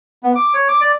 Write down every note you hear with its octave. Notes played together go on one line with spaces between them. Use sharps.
B3
D6
C#5
D6
D5